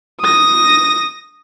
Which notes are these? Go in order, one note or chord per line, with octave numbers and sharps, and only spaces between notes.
D#6 A#6